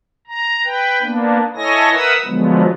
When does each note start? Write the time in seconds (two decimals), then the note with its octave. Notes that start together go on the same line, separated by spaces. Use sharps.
0.27 A#5
0.65 B4 G5
1.02 A#3 B3 D4
1.56 E4 A4 C#5 D#5 G#5 A#6
1.92 A#4 B4 E5 F#5 D#6 E6
2.25 D3 F3 F#3 G#3 B3